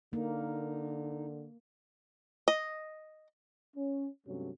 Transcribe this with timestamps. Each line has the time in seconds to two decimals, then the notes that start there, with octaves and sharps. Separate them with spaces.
0.13 D3 A#3 D#4
2.48 D#5
3.76 C#4
4.27 G2 C3 F#3 A3 C#4